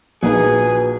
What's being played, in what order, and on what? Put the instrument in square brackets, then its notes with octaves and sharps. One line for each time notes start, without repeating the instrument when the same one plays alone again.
[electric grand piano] A#1 [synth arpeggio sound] F3 A#3 D#4 [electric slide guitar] F#4 B4 F#5 [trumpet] G#4